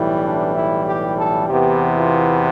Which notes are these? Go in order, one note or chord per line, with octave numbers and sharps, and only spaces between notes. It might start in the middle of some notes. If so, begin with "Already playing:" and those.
Already playing: B1 A2 E3 G3
D4
E4
G4
A4
E2 C3 E3 B3 G4
F4